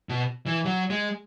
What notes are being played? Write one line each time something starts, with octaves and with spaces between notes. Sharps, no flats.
B2
E3
F#3
G#3